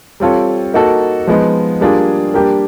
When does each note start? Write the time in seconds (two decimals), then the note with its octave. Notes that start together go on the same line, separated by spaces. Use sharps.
0.20 G3 C4 F4 A4 C#5
0.74 A#3 D#4 F#4 A4
1.27 F3 G#3 B3 D#4
1.81 G3 A#3 D4 F4 G#4
2.34 G3 A#3 D4 G4 A#4